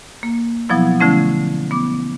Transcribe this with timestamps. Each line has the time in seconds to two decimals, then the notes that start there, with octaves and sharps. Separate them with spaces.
0.23 A#3
0.69 B2 F3 F#3 B3 E4
1.00 D3 F3 A3 C#4 E4
1.71 B3 D6